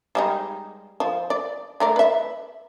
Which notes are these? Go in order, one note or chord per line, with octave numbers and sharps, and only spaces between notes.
G3 G#3 D#4
F3
D5
A3 A#4 D5
B4 E5